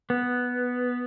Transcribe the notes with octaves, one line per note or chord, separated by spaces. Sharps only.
B3